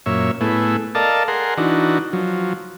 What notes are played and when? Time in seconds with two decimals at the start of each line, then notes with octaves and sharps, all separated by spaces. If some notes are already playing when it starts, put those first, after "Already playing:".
0.06 F#2 A#2 C#5 E5
0.41 A2 A3 B3 E4 G#4
0.95 A4 A#4 D5 D#5 F5 A5
1.28 G#4 A#4 F#5 C6
1.57 E3 D4 D#4 F#4
2.13 F3 F#3